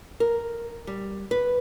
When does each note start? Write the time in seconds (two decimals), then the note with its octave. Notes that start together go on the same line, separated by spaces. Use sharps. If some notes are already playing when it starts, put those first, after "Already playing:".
0.20 A#4
0.87 G3
1.31 B4